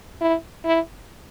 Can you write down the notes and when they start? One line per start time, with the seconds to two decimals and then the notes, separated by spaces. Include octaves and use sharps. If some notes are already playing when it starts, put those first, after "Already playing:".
0.21 E4
0.65 E4